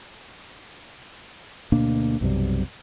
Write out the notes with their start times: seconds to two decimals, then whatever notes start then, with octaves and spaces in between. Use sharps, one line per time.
1.72 D2 B2 A#3 D4
2.21 B1 F#2 C3 G3